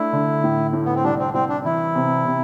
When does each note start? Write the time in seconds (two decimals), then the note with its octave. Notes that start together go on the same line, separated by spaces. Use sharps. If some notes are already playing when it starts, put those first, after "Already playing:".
Already playing: A3 D4 E4
0.13 D3
0.44 A2
0.73 A2
0.85 B3
0.95 C4
1.04 C2 D4
1.19 C4
1.34 C2 C4
1.49 D4
1.64 E3 E4
1.95 C3
2.25 C3